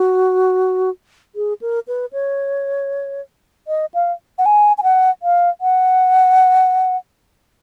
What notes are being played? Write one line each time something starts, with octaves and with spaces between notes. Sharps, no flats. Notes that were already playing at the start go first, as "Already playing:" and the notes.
Already playing: F#4
G#4
A#4
B4
C#5
D#5
F5
F#5
G#5
G#5
F#5
F5
F#5